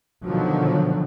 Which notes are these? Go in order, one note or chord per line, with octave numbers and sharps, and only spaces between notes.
B2 D3 D#3 F3 F#3